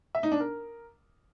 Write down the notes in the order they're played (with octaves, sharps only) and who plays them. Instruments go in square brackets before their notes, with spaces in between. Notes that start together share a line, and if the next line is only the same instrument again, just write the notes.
[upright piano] E5
D#4
D4
A#4